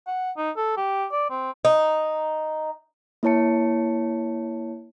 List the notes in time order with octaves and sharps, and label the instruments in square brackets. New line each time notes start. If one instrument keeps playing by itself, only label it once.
[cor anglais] F#5
D#4
A4
G4
D5
C4
[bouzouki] D#4
[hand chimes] A#3 E4 C#5 A5 C#7